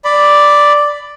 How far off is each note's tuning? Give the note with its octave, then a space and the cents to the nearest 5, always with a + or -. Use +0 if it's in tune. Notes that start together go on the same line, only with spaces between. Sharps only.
D5 +0 B5 +10